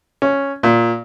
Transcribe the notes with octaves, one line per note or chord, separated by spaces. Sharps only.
C#4
A#2